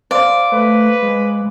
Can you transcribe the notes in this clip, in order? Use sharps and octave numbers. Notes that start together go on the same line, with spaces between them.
C5 D5 F5 C6
A3 B4
G#3